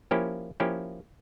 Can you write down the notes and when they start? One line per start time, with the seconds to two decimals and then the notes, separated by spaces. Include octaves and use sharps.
0.11 F3 A#3 C#4 E4 G4
0.60 F3 A#3 C#4 E4 G4